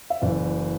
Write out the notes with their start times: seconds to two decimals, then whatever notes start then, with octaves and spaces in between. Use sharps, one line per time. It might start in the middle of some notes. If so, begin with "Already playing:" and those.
0.10 E5
0.22 F#1 F#2 E3 D5